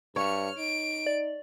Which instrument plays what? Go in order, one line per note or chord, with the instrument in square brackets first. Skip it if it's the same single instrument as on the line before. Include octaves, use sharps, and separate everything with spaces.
[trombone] G2 [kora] C#5 [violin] F6 C#7
[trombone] D#4 [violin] D7
[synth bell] D5